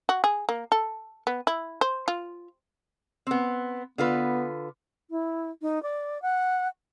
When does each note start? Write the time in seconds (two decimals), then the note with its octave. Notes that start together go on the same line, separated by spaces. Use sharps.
0.09 F#4
0.24 G#4
0.49 A#3
0.72 A4
1.27 B3
1.47 E4
1.81 C5
2.08 F4
3.27 B3 C4
3.98 D3 B3 F4 B4
5.10 E4
5.62 D#4
5.83 D5
6.22 F#5